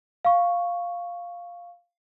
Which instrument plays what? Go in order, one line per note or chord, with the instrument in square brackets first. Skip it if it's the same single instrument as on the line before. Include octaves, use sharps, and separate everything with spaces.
[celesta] F5 C#6